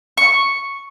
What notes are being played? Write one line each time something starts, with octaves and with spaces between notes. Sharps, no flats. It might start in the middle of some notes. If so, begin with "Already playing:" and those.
C#6